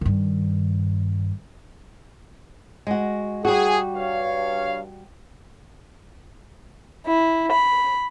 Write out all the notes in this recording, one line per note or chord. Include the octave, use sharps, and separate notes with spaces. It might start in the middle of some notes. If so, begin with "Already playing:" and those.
G2 D#3
G#3 F#4
G3 F#4 G#4
G2 C#5 F5
E4
B5